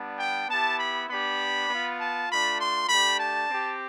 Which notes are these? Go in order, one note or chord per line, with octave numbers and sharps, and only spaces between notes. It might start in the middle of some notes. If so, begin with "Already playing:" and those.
Already playing: G3 B3 D4
G5
B3 E4 G4 A5
B5
B3 D4 G4 B5
B3 F4
A5
A3 D4 F4 B5
C6
A3 D4 G4 B5
A5
C4 G4